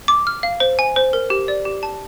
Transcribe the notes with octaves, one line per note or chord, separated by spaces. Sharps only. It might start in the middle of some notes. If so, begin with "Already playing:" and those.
D6
F6
F5
C5
G#5
C5
A#4
G4
D5
G4
A5